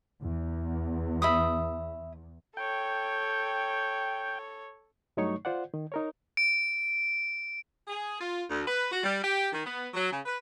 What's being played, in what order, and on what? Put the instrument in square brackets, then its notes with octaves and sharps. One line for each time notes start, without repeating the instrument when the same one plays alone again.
[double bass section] E2
[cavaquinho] E5 B5 D#6
[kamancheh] A4 C#5 [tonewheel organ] G5
[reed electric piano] G2 F#3 A3 D#4 C#5 C#6
F4 C5 D5 F#5
D#3
D#4 A#4 C#5
[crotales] D7
[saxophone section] G#4
F4
D2
B4
F#4
G3
G4
D#3
B3
F#3
C#3
B4